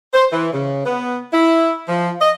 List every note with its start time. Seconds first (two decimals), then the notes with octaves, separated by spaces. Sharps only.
0.14 C5
0.31 E3
0.53 C#3
0.86 B3
1.33 E4
1.89 F3
2.20 D#5